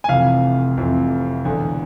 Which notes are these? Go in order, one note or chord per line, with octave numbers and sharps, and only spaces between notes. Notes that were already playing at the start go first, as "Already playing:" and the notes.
G#5
F1 F2 C3 E3 F5
F1 F2 C3 E3
E1 E2 D3